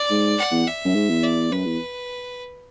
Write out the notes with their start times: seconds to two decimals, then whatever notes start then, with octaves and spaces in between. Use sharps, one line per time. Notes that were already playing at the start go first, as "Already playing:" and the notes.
Already playing: D5
0.10 G#2
0.38 F#5
0.52 E2
0.67 E5
0.85 F#2
0.95 G#2
1.10 E2
1.23 D5
1.51 F#2 B4
1.66 E2